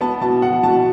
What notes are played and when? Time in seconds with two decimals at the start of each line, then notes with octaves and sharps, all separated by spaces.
0.01 B3 A5
0.21 B2 A5
0.42 B2 F#5
0.63 B2 A5